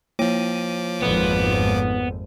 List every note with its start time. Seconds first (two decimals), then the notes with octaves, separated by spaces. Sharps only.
0.19 F3 A#3 C#5 D6 D#7
1.02 G#1 F2 B3